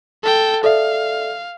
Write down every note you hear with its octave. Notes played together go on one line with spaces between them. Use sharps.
A4 G5
A4 D5 E5 F5